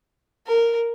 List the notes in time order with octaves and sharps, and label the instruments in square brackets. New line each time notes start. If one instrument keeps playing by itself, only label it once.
[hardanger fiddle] A#4